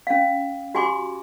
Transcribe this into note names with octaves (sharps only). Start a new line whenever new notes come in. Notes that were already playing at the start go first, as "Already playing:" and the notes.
C#4 F5
F#4 G4 G#5 A#5 C6 D6